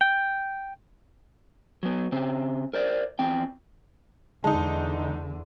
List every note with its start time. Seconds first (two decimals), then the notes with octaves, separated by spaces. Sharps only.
0.01 G5
1.83 F#3 B3
2.12 C#3 C4
2.74 A#4 C5 D5
3.19 E2 C4 G5
4.44 E2 D3 G#3 D#4 A5